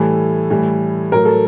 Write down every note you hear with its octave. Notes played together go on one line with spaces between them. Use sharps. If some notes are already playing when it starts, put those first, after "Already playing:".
Already playing: A2 E3 G3 A4
A2 E3 G3
A2 F#3 A#4
A4